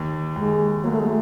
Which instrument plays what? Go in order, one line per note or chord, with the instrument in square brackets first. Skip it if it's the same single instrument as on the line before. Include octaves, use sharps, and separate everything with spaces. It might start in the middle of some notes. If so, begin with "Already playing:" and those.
Already playing: [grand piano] D#2
[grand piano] D#2 [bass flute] G#3
[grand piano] F#3 [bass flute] A#3
[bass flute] A3
G#3
A3